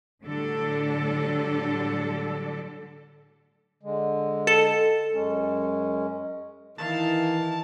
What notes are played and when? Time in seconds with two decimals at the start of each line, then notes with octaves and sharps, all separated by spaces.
0.23 A2 D3 F#3 G3 D4 A4
3.83 D3 G#3
4.47 A4
5.13 F#2 G#3 C#4
6.78 D#3 E3 E4 F5 A5